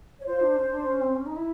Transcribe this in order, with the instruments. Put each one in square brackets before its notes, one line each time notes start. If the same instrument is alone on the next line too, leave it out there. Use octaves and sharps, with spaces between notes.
[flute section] C#5
[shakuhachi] F4 [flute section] C5
[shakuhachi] D4
C#4
D4
C#4
C4
C#4
D#4
E4